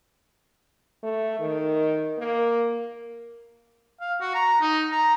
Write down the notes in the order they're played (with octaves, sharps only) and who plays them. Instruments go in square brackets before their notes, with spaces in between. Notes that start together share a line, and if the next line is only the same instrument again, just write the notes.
[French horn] A3
D#3
A#3
[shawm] F5
F#4
A#5
D#4
A#5